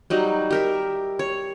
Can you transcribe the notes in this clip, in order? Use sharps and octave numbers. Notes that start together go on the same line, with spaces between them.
F#3 G3 D#4
G4 A#4 E5
C#5